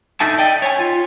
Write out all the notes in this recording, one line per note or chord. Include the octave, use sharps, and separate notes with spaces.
D#4 A4 E5 A5
D5 D#5 G5
C#5 G#5
F4